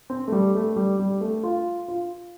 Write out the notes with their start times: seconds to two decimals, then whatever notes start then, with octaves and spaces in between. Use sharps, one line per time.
0.10 C4
0.28 A3
0.32 G3
0.55 A3
0.76 G3
0.99 G3
1.21 A3
1.43 F4
1.88 F4